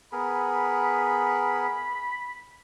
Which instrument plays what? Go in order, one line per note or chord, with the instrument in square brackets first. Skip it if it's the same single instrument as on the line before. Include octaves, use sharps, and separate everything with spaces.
[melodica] B3 G#4 A#4 [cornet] B5